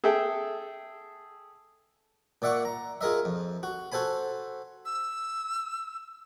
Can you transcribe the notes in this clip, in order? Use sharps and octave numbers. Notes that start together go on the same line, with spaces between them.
G#4 A4 E5 G5
A#2 D5 E5 F#5 C#6
A#5
F4 G#4 A#4 D#5 E5
F2
F#4
F#4 A4 C5 G#5 B5
E6